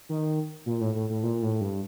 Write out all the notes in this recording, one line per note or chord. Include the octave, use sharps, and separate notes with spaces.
D#3
A#2
A2
A2
A2
A#2
A2
G2